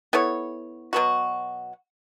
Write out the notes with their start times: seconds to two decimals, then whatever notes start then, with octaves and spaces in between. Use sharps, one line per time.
0.13 B3 E4 A4 C#5
0.93 B2 F#3 B3 F#4